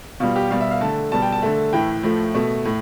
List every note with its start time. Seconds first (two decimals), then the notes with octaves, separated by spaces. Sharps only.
0.20 B2 G3 F4
0.36 G4
0.50 B2 G3 F5
0.60 E5
0.71 F5
0.81 D3 A3 A5
1.12 B2 G3 A5
1.22 G5
1.32 A5
1.42 D3 A3
1.73 A2 E3 A3 G5
2.03 A2 F3 A3
2.34 B2 A3
2.65 A2